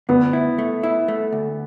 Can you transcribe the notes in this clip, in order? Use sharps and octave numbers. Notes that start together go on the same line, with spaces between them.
D2 B3
E4
A3
E4
A3
D2